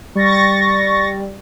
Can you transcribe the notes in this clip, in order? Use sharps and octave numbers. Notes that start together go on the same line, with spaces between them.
G3 C#6 A6 A#6